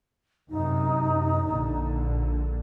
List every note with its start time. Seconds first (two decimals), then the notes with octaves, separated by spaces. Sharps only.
0.50 F#2 C3 D#4
1.44 A#1 D3